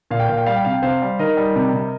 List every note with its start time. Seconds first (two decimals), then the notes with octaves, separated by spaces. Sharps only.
0.11 A#2 F5
0.19 G5
0.28 A#2 F5
0.37 G5
0.46 G3 F5
0.56 G5
0.65 C3 F5
0.73 G5
0.82 C3 C5 F5
1.02 G3
1.19 D#3 A#4 D#5
1.37 G3
1.56 C3
1.73 C3